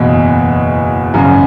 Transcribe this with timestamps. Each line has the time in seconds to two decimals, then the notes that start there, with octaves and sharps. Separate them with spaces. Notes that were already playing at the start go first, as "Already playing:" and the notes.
Already playing: F#1 E2 B2
1.14 G#1 F#2 C#3